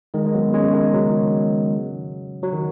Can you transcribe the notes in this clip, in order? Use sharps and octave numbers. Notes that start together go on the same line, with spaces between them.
D#3 G#3
G#3
F#3 B3
G#3 C#4
D#3 G#3
C#3 F#3
F#3
D#3